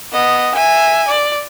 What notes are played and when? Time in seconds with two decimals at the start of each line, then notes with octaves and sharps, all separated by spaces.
0.13 B3 D#5
0.55 E5 G#5
1.08 D5